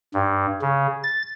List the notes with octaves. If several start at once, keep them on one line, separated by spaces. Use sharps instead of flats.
G2
C#3
A6